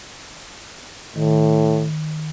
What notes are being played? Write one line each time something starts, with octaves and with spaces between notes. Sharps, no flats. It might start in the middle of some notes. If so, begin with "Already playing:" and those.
A2 D#3